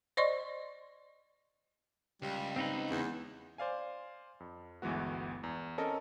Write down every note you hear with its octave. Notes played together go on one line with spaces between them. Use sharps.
C5 D5 D#5 C6 C#6
C#2 G3
C4 D#4 B4
E2
C5 D5 F5 G#5
F2
G1 D2 E3 G#3 B3 F#4
E2
C4 C#4 A4 A#4 D#5